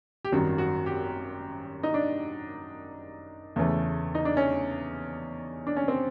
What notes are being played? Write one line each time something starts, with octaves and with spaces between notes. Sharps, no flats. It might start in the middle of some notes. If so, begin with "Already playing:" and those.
G4
G#1 F#2 D#3 G3 F#4
F#4
G4
D#4
D4
E2 C#3 E3 A3
D#4
D4
C#4
D4
C#4
C4